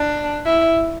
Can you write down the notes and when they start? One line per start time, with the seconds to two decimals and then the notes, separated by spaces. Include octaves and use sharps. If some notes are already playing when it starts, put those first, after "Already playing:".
Already playing: D4
0.46 E4